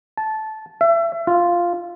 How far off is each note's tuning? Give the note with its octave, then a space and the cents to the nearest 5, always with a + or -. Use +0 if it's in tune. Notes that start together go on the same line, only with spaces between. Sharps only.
A5 -15
E5 +30
F4 -5